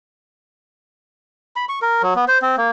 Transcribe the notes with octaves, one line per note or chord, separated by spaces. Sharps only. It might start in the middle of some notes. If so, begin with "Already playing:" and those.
B5
C#6
A#4
F#3
B3
C5
C4
A#3